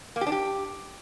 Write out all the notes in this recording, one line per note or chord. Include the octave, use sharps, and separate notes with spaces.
A#3
G4
D4
G4